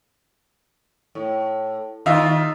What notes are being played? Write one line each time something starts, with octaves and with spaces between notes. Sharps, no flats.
A2
D#2 D#4 F4 E5 F5